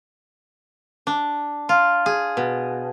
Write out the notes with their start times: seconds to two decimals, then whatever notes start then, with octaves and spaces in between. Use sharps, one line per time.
1.07 D4
1.69 F4
2.06 G#4
2.37 B2